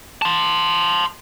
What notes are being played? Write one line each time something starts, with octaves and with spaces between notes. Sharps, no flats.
A5 C6